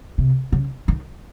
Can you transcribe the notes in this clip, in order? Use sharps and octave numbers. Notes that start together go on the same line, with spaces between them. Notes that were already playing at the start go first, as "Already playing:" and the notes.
C3
C#3
D#3